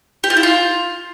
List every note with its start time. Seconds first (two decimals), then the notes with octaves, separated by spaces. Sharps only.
0.24 G4
0.30 F4
0.37 E4
0.43 F4